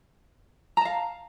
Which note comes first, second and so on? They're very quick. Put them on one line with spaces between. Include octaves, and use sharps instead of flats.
A#5 A5 F5